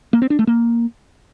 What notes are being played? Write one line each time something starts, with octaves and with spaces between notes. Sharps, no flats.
A#3
C4
D4
A3
A#3